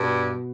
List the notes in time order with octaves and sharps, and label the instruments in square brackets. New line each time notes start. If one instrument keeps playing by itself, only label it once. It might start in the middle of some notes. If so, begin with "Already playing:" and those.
Already playing: [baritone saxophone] G2 [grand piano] B2 B3